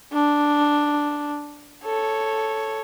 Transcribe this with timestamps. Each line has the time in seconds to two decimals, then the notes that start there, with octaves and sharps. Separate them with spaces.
0.13 D4
1.84 A4 C#5